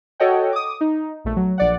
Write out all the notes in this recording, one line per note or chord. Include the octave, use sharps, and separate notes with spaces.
F#4 A4 C#5 D#5 F#5 G5
D6 D#6
D#4
A#1 A3
F#3
A#1 D5 F#5